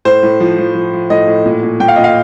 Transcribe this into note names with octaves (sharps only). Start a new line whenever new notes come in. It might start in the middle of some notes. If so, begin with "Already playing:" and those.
A2 C5
A2
F3
F3
F3
F3
A2 D#5
A2
A#2
A#2
A#2 G5
F5
A#2 D#5
F5